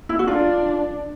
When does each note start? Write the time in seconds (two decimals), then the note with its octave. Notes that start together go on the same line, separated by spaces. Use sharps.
0.09 E4
0.19 F#4
0.27 D4 F4